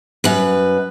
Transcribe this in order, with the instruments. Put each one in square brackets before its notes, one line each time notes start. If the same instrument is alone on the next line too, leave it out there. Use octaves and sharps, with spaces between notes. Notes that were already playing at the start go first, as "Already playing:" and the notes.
[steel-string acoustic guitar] F#2 B4